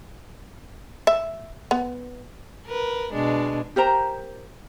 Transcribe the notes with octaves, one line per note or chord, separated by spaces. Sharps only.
E5
B3
A#4 B4
B2 G#3 D4
G4 A#4 C5 A#5